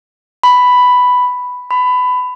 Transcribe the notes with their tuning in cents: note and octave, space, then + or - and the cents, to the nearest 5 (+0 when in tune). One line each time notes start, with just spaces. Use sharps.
B5 +5
B5 +20